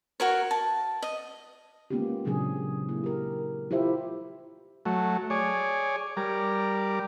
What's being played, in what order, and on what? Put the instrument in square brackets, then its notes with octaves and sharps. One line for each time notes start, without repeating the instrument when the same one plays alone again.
[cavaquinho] F#4 A#4 C#5
A5
D#5
[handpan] G#3 A#3 B3 C#4 F4 G4
A#2 C#3 F#3 C4 D4 G#4
A#3 E4
G4 A#4
E4 F4 G4 C5 E5
[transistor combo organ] F#3 A3
G#4 C#5 D5
G3 A#4 D5